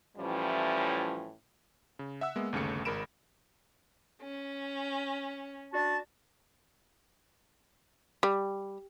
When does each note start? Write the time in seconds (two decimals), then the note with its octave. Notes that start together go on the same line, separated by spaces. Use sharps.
0.18 A2 E3 F3 G3 C#4
1.99 C#3
2.21 E5 F#5 E6
2.36 G#3 A#3 B3
2.53 G1 D#2 C#3 A3 C#7
2.85 G#1 G#3 A#4 B5 D7 E7
4.21 C#4
5.73 D4 F#4 A5
8.23 G3